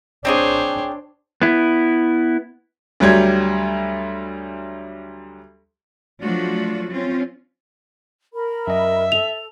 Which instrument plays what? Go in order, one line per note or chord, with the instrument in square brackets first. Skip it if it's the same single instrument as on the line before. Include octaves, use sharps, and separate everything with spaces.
[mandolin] C4 D#4 G#4 [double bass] D4 [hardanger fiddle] C5 C#5
[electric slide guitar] B3 E4
[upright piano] D2 F#3 G3 G#6
[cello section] F3 F#3 A3 D4 F4 F#4
C4 C#4 F4
[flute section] A#4 B5
[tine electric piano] F#2 D#5 [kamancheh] E5
[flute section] A4 [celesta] F7